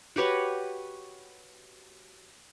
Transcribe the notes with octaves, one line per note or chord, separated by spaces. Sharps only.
F#4 G4 B4 C#5